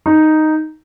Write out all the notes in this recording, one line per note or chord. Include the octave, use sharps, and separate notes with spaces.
D#4